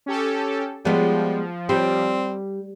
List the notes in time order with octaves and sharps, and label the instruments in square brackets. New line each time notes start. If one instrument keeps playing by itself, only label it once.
[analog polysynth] C#4 G4 A4
[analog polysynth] F3 [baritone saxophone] G3 [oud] G#3 B3
[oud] G3 [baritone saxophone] C4